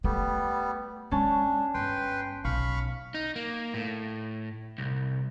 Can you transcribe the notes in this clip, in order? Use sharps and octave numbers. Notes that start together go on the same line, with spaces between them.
G3 A3 B3
F#3 G#3 C#4 D4 A5
G1 B4 G5 C6
B1 F5 B5 C#6
D#4
A#3
A2
C2